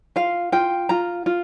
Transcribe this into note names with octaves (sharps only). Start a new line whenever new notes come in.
F4 F5
F4 G5
F4 A#5
F4